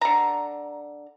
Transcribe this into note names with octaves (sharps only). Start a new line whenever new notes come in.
D3 A#5